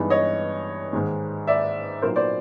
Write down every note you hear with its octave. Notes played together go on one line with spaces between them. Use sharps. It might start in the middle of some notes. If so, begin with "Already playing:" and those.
Already playing: G2 E3 G#3 B3 D#4
C#5 D#5
G#2 D#3 G#3
D5 E5
A#2 F#3 B3 D#4 A#4 C5
C5 D5